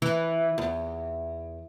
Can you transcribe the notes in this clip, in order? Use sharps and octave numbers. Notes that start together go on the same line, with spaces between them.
E3
E2